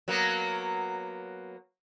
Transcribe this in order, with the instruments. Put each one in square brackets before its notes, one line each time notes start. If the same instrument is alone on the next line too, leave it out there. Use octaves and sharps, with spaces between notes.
[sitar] F#3 A#3 B3